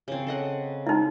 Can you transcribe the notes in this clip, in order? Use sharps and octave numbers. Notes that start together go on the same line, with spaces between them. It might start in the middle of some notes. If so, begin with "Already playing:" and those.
C#3 C4
A4 D#5 F#5
D#4 E4